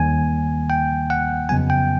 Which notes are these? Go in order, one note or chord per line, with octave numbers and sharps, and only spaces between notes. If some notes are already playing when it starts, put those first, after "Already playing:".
Already playing: D#2 D#3 G3 A#3 G#5
G5
F#5
F2 C#3 F#3 B3 G#5
G5